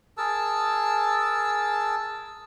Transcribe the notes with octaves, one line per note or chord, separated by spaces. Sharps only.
G#4 A#4 A5 E6